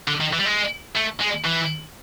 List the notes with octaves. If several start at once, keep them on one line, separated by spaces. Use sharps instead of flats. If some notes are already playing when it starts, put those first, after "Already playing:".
D3
D#3
E3
G3
G#3
A3
G#3
E3